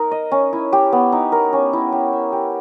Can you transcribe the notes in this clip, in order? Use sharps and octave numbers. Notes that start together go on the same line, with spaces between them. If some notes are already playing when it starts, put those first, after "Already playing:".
Already playing: D#4 A#4
D#5
C#4
E4
G4
B3
D#4
A#4
C#4
E4
G4
E5
G4